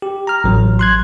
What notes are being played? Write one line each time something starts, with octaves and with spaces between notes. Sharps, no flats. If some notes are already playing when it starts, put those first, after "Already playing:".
G4
A#5 F6
A1 F#3
C6 F#6 G#6